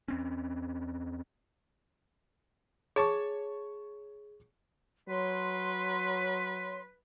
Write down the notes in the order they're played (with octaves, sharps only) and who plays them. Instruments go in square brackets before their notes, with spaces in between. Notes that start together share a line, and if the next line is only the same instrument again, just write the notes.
[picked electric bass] E2 C4 C#4
[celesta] G#4 [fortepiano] C#5 A5 C#6
[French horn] F#3 [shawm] B4 [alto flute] C#5 [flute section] C6